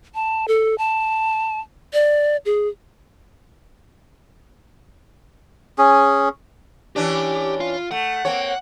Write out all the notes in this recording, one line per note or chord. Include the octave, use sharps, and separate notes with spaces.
A5
A4
A5
D5
G#4
C#4 G#4
E3 C#4 D4 G4
F4
A3 F#5
A#3 C4 C#5